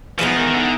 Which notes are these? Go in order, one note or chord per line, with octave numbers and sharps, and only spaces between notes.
E3 F3 G#3 B3 D#4
D#3
D#3
D3